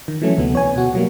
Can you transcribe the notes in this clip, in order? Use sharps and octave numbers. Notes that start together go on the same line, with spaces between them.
D#3
E3 F#3 A3 C#4
D2 C3 E3 B3
C#5 G#5
B2 F#4
B2 F#3 G3 A#3